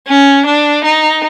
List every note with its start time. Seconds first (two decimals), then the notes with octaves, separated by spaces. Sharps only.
0.08 C#4
0.47 D4
0.85 D#4